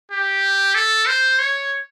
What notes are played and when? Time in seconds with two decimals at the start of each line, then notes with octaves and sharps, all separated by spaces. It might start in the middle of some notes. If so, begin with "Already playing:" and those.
0.11 G4
0.75 A4
1.06 C5
1.39 C#5